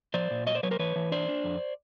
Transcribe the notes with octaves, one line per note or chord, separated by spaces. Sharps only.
F3 C5 D5
A#2
F#3 C#5 D#5
C5 D5
F#3 B4 C#5
A#4 C5
E3 B4 C#5
E3
D4 C5 D5
D4
F2